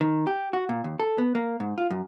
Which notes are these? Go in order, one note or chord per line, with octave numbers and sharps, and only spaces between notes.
D#3
G4
F#4
A#2
D#2
A4
B3
A#3
G#2
F4
F#2